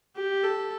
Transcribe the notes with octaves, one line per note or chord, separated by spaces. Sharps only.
G4
A4